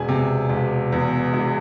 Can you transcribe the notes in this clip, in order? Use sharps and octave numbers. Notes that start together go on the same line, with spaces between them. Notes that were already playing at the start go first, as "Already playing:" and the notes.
Already playing: E1 G#4 G#5
C3
E1
E2
E1